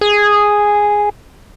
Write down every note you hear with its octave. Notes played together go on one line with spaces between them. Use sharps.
G#4